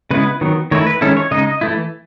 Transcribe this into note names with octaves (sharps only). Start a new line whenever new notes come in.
C#3 G#3 B3 E4 B4
D#3 F#3 B3
D#3 A3 E4 C#5
B4
D#3 G#3 C#4 E4 A4
C#5
C#3 G#3 D#4 D#5
E3 A3 E4